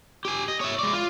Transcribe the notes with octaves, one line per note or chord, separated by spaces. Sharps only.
G4 G#5
D#5
C#5 E5
G#3 D5
F4